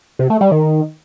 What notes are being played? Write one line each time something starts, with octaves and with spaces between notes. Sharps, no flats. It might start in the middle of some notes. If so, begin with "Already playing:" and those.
C3
A3
G3
D#3